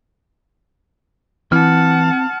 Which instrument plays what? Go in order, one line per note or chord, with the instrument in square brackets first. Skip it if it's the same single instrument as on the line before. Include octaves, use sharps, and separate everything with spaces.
[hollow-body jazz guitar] E3 [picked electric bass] C4 [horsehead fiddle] F#5 A5 [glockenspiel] F6